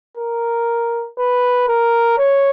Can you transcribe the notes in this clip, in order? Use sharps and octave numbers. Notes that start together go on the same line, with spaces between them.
A#4
B4
A#4
C#5